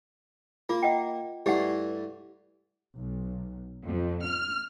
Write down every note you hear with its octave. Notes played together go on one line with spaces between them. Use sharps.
A#3 F4
D#5 F#5 G5
G2 E3 A3 G4 F#5
B1
F2
F6